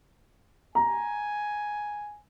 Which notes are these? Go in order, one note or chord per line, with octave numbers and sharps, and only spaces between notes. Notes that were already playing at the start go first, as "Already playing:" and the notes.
G#5 A#5